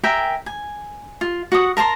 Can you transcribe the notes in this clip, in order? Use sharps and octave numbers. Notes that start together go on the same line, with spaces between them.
A#4 E5 G5 G#5
G#5
F4
F#4 F#5 D#6
A#4 A5 A#5 C6